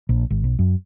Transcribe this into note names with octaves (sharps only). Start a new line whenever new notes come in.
A#1
G#1
B1
F#2